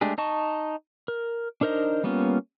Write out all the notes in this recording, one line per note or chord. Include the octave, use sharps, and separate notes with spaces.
G#3 A3 D4 G4 G#4
D#4 D#5 A5 C#6
A#4
D4 D#4 A#4 C5 D#5
G3 A#3 B3 C#4 F4